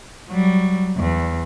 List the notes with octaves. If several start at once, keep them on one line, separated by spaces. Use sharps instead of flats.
F#3 G3
E2